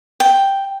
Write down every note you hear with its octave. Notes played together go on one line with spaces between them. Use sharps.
G5